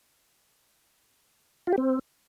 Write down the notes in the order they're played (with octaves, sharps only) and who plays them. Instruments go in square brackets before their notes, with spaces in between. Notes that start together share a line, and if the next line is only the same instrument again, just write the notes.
[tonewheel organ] F4
G4
C4